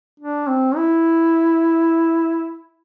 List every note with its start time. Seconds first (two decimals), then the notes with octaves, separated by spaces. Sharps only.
0.20 D4
0.48 C4
0.76 E4